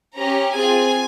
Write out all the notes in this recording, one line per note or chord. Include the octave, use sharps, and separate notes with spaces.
C#4 G4 A#5
C4 F4 G#4 G#5